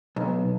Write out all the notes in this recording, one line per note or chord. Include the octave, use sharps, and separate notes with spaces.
B1